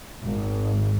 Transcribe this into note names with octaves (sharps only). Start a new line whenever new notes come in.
G#1